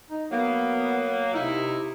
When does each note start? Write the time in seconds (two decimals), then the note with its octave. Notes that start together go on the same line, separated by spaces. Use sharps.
0.11 D#4
0.32 F#3 A#3 B3
1.34 C3 D#4 E4